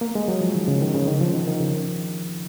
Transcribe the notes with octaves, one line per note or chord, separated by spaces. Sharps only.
A#3
G#3
F#3
F3
D#3
C#3
D#3
C#3
D#3
F3
D#3
D#3
C#3